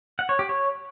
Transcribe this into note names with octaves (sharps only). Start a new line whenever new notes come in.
F#5
C#5
G4
C#5